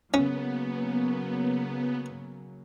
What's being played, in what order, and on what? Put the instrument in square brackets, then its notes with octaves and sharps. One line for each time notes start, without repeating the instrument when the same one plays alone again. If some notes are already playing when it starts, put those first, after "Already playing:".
[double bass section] C#3 F#3 A#3 [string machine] B3 [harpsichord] C#4